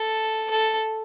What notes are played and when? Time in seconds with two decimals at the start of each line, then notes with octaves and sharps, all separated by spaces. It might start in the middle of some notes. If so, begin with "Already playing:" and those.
Already playing: A4
0.51 A4